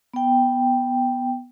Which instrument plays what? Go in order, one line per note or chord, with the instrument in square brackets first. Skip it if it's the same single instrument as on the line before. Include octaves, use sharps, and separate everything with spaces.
[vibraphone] B3 G5